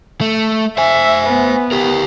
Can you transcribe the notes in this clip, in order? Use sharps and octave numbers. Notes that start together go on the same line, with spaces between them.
A3
C5 E5 G#5
B3
G4 A#4